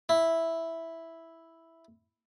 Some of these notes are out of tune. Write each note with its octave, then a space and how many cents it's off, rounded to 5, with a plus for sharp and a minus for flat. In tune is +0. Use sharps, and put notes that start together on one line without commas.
E4 -5